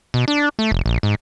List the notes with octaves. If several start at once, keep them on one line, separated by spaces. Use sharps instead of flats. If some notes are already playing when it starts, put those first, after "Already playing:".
B2
D4
A3
F1
A#1
G#2